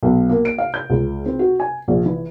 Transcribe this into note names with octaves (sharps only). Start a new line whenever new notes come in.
B1
A#3
D7
F5
G6
C#2
C4
F#4
G#5
A#1
E3